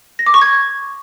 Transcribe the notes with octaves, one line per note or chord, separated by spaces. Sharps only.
A#6
D6
C#6
G#6